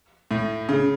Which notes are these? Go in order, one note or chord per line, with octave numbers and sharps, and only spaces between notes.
A2
C#3